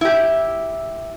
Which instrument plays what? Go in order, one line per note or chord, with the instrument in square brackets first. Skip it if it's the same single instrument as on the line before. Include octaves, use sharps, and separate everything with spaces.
[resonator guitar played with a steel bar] E4 G4